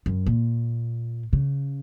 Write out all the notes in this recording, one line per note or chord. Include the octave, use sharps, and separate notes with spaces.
F#2
A#2
C#3